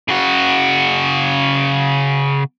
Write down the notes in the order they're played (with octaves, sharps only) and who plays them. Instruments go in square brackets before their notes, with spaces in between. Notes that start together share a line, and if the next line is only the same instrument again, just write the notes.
[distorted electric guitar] C#3 F#4